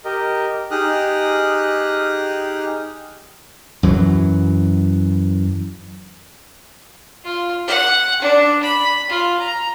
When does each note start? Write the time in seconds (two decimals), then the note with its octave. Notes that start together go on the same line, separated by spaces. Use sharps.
0.05 G4 A#4 D#5
0.71 D#4 G4 G#4 D#6 F6 F#6
3.83 F#2 E3 F#3
7.25 F4
7.67 F#5
8.21 D4
8.62 B5
9.10 F4
9.39 A#5